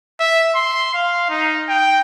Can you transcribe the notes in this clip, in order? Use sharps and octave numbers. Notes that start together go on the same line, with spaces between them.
E5
C6
F5
D#4
G5